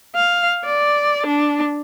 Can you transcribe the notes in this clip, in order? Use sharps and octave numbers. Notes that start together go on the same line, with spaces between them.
F5
D5
D4